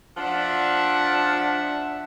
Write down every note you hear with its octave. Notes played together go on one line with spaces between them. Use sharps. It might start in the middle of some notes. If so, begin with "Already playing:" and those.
F3 D4 E5 F#5